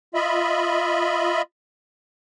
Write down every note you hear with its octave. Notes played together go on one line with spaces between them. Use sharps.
F4 D#5 E5 B5